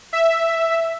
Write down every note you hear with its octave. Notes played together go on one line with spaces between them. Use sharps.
E5